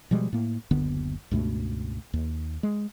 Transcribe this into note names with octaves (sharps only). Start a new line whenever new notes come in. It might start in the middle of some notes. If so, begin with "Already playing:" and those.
B2 F3 G3 G#3
A2 A#3
F#1 D2 D3 B3
C#2 G2 B2 A3
D#2
G#3